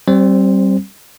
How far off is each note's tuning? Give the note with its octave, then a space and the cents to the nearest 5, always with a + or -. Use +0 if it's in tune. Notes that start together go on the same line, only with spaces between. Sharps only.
G3 -20 C4 +25 C5 +0